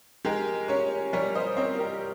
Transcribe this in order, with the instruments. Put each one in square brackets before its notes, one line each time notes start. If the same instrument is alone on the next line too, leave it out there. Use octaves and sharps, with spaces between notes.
[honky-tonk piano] G#3 [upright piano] G4 A#4
[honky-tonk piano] C#4 [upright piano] A#4 C#5
[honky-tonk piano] G3 [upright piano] A#4 C#5
[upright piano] C5 D#5
[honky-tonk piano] C4 [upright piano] A#4 C#5
[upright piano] G4 A#4